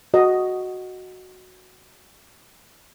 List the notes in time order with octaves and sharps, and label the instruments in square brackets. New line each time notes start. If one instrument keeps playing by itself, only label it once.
[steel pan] F#4 D#5